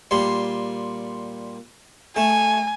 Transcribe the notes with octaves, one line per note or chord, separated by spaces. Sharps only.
A#2 G3 C6
A3 G#5